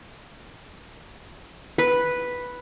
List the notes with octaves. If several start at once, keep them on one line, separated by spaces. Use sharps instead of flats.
B4